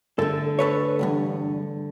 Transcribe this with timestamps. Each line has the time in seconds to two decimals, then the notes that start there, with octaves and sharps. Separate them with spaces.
0.19 D3 A3 A4
0.59 A4 B4 C#5
0.99 B1 E2 G2